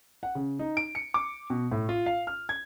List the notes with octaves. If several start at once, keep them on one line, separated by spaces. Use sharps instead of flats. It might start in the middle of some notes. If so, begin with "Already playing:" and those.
F#5
C#3
D#4
D7
C#7
D6
B2
A2
F4
F5
F6
G#6